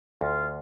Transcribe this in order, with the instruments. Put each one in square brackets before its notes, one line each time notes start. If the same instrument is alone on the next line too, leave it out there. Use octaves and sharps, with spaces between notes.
[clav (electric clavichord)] D2 [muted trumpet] F4